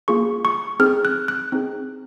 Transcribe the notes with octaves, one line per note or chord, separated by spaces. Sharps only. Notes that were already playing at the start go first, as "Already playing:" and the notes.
A#3 F4 G#4 C#6
C#6
C4 D#4 G#4 F6
F#6
F#6
C4 D#4 G#4